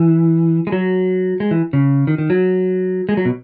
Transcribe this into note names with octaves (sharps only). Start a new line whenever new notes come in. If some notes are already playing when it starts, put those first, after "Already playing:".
Already playing: E3
G#3
F#3
G#3
E3
C#3
D#3
D#3
F#3
G#3
F#3
B2